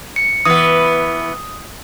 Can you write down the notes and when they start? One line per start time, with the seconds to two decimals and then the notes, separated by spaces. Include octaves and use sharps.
0.16 C#7
0.45 E3 B3 D#6